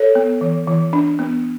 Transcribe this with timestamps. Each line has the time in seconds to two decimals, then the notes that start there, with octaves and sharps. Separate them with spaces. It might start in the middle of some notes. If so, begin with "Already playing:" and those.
Already playing: A4 C#5
0.15 B3
0.41 E3
0.67 E3
0.93 D4
1.19 B3